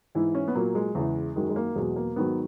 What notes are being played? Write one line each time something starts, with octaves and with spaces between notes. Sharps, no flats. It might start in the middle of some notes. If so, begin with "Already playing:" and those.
G#2 E3 E4
C#4
B3
A#2 F#3 A#3
G#3
E2 C#3 E3
F#2 D#3 F#3 G#3
G#3
A#3
E2 B2 F#3 G#3
A#3
G#2 D#3 F#3 B3